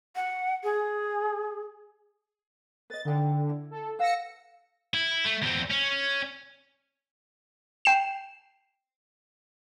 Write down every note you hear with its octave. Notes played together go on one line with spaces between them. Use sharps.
F#5
G#4
B4 D#5 A6
D3 D#4 G5
E4
A4
B4 F5 F#5 E6 A#6 C#7
E4
A3
E2 C4
C#4
G5 C7 E7